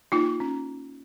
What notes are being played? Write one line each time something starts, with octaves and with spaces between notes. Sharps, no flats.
A#3 D#4 F4
C#4